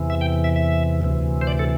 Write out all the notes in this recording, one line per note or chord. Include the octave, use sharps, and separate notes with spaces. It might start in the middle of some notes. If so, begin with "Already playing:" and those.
Already playing: E2 C3 E3
E5
G5
E5
E5
D2 C3 E3
C5
D5
A4